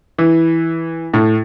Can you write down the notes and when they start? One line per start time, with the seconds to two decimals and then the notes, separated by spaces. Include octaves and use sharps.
0.18 E3
1.14 A2